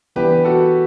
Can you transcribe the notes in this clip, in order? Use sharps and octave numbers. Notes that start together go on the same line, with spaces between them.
E3 B3 D4 G4 B4
F#4 A4